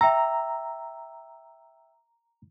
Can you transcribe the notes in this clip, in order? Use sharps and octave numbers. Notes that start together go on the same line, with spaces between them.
E5 G5 A#5 E6